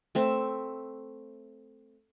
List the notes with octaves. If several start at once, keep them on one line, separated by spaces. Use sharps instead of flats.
A3 C4 E5